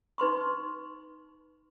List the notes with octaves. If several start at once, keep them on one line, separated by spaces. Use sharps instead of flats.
D#4 B4 C6 C#6